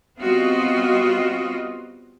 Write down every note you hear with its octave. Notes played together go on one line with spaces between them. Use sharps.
G3 B3 C4 F4 F#4 D#5